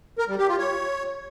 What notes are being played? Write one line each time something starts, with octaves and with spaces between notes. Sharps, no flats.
A#4
G3
G4
F4
C#5